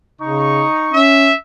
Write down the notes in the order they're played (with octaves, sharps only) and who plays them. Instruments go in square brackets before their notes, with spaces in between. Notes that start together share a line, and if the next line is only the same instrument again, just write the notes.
[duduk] C#3 [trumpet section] D#4 C#6
[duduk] C#4 [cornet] E5